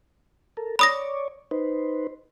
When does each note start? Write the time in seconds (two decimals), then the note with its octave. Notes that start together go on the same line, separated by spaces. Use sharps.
0.57 A4 A#4
0.79 C#5 D5 B5 D#6 A#6
1.51 D#4 B4 C5